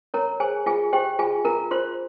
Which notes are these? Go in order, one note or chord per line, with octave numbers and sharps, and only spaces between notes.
A#4 C#5 A#5
G#4 C5 G#5
F4 G#4 G#5
G4 C5 G5
F4 G#4 G#5
F4 A#4 A#5
F4 C5 C6